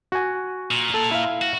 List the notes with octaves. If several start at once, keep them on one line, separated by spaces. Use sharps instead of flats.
F#4 G#5
A#2
A4
E4 F5
F#4